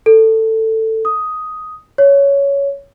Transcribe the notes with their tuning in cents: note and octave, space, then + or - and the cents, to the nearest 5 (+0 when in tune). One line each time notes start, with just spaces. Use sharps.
A4 +15
D#6 +5
C#5 +10